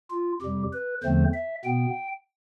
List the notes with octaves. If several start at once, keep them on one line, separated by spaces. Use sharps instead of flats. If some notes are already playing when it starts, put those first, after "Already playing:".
F4
F2 C3 G3 G4
B4
E2 D3 F3 A3 C4 C5
E5
B2 B3 G5